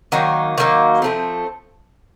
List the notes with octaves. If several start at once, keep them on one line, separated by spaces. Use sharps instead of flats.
D#3 F#3 A#3 D#4
D#3 F#3 A#3 D#4
F3 A3 C4